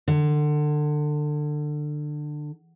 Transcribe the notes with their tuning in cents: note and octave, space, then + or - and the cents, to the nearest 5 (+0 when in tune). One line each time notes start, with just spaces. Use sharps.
D3 +25